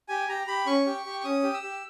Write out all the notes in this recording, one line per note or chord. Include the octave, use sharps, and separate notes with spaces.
G4 G#5
G4 A#5
G4 B5
C#4 C#6
G4
G4
C#6
C#4 D#6
G4
E6
G4